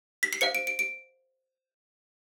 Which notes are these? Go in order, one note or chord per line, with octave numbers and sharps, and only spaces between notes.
B6
C7
C5 F5 C#7
D7
D7
D7